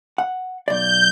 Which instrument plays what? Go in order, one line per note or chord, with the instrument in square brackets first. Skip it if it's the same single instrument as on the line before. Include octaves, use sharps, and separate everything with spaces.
[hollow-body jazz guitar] F#5
[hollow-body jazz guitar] B1 D5 [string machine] G6